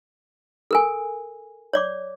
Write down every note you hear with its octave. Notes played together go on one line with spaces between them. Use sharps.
A4 A#4 G#5
C#5 D5 D6